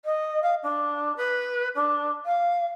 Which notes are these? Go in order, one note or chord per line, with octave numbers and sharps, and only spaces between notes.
D#5
F5
D4
B4
D4
F5